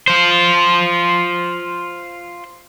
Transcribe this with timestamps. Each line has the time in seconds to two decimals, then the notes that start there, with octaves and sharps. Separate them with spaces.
0.08 F4 C5